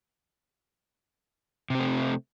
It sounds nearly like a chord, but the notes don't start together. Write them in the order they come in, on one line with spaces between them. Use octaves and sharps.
C3 C4 A3